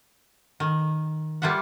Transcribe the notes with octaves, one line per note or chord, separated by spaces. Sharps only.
D#3
G3 A#3 F4 E5 F#5